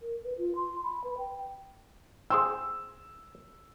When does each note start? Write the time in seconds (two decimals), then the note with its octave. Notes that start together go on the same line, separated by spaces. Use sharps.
0.02 A#4
0.24 B4
0.38 F4
0.56 C6
0.84 B5
1.04 B4
1.18 G5
2.30 G#4 C5 G5 E6